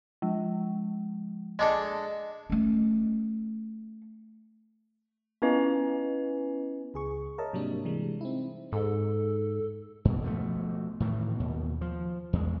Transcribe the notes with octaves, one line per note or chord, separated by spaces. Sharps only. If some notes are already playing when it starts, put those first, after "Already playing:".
F3 G#3
G#3 D4 A4 D#5
A3 C#4
B3 C#4 E4 B4 D#5 G#5
C#2 G#4 C#6
A#4 C#5 D#5 E5 A5
G#2 C3 F#3 G3 A#3 D4
C3 E3 G3 G#3
C4 D#4 E4
G#2 A4
G2 B2
B2 F3 A3
A2 D#3 E3
D#2 B2
F3
E2 G#3